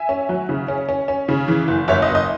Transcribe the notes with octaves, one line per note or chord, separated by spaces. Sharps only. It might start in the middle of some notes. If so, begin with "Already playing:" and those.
Already playing: E5 G#5
C#4
F#3
C#3
C#4
C#4
C#4
C#3
E3
F#1
F#1 C#5 E5
D#5
F#1
D#5